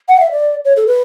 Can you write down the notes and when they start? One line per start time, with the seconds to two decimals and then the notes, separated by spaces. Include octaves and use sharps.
0.09 F#5
0.20 E5
0.31 D5
0.65 C#5
0.76 A4
0.87 B4